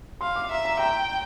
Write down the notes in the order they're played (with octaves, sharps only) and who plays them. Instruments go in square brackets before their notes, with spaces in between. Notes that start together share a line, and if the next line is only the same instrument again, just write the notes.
[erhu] F5 [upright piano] C6
[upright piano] D6
[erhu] E5 [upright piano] A#5
[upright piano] A#5
[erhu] G5 [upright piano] A#5